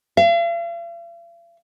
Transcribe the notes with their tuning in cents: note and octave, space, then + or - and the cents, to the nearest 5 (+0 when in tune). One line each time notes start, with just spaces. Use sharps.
F5 -45